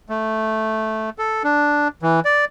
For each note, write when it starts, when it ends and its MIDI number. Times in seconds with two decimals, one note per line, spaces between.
0.09 1.10 57
1.18 1.43 69
1.44 1.88 62
2.02 2.20 52
2.25 2.45 74